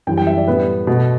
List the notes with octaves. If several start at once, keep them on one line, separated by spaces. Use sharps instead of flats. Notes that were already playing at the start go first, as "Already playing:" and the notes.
F#2 E3 G3 G5
G5
E5
D5
A2 G3 B3 B4
B2 A3 F#4